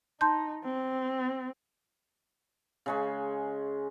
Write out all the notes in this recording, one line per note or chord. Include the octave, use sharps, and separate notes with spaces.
D#4 A5 C6 G6
C4
C#3 G#3 C#6